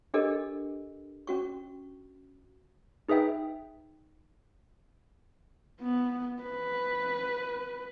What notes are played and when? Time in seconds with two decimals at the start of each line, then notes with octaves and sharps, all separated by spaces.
0.14 D4 G4 A4 A#4 D#5
1.27 C#4 F#4 C#6
3.09 D#4 G#4 B4 E5 G5
5.81 B3
6.42 B4